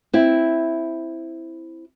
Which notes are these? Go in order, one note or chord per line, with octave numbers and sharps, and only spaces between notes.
C4 E4